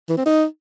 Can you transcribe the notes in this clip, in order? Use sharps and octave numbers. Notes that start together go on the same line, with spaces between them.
E3
C4
D#4